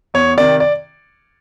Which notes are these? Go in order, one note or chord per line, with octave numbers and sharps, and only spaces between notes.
E2 C#5
C3 D#3 D5
D5